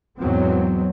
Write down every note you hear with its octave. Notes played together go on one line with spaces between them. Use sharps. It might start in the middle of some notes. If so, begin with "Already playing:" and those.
E2 G#2 F#3 B3 C4